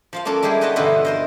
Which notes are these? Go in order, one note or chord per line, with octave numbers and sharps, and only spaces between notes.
F3 F4 F5
A#3 C#4 D4 A4 A#4
G3 G#3 E4 G4 G#4
D#4 F#4 B4 D#5 A5
G2 B2 D3 E3 E4 F4
A#4 C5 D#5